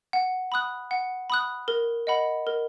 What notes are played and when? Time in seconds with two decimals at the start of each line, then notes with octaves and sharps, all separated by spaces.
0.13 F#5
0.52 B5 D#6 F#6
0.91 F#5
1.30 B5 D#6 F#6
1.68 A#4
2.07 D#5 F#5 B5
2.47 A#4